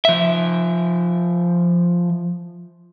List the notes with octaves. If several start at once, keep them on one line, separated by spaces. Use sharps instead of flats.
F3 E5